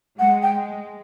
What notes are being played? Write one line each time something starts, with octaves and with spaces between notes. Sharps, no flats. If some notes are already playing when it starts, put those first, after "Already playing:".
G#3 F#5
G5